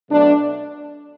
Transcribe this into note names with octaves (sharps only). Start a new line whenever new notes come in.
B2 F#3 A3 D4